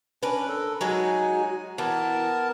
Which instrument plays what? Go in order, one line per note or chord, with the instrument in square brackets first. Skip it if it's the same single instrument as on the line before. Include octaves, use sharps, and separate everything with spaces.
[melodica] C#4 D4 [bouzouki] A#4 B4
[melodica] A4
[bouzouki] F#3 G#3 F#4 [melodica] D#4 G#5
[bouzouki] E3 [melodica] B3 A#4 A5